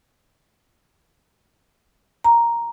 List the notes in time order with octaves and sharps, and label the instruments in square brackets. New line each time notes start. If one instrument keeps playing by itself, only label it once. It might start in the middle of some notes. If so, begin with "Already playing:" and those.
[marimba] A#5